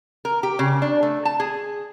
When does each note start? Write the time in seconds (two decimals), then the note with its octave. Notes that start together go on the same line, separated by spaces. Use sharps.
0.25 A#4
0.43 G4
0.59 C#3
0.82 D4
1.03 A3
1.25 A5
1.40 G#4